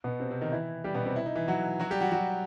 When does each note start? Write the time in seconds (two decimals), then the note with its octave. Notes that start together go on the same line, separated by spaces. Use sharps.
0.04 B2 B3
0.20 C3 C4
0.31 C3 C4
0.41 D#3 D#4
0.52 E3 E4
0.84 G3 G4
0.94 B2 B3
1.05 C3 C4
1.16 E4
1.26 D#4
1.35 E3 E4
1.48 F#3 F#4
1.80 F#3 F#4
1.91 G3 G4
2.01 F#3 F#4
2.12 F#3 F#4